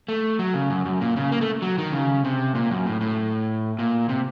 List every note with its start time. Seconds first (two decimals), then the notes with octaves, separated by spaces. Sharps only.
0.08 A3
0.39 F#3
0.54 C#3
0.70 F#2
0.85 F#2
1.01 A#2
1.16 C#3
1.32 A#3
1.41 A3
1.62 F#3
1.78 D#3
1.93 C#3
2.24 C3
2.55 A#2
2.71 F#2
2.86 A2
3.01 A2
3.79 A#2
4.09 C3